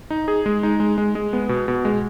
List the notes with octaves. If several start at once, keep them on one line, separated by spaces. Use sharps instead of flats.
D#4
G#4
G#3
D#4
G#3
G#3
G#3
B3
B2
B2
G#3